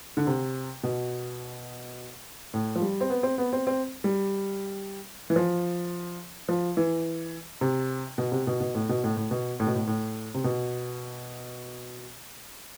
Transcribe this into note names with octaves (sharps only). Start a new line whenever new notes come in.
D3
C3
B2
A2
F3
G3
C4
B3
C4
B3
C4
C4
G3
E3
F3
F3
E3
C3
B2
C3
B2
B2
A2
B2
A2
A2
B2
A2
B2
A2
A2
C3
B2